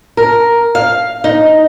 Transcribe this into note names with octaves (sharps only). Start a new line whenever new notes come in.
A#4
F5
D#4